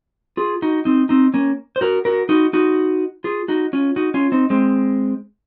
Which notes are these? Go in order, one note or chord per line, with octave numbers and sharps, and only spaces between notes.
F4 G#4
D#4 F#4
C4 D#4
C4 D#4
A#3 C#4
C5
F#4 A#4
F#4 A#4
D#4 F#4
D#4 F#4
F4 G#4
D#4 F#4
C#4 F4
D#4 F#4
C#4 F4
C4 D#4
G#3 C4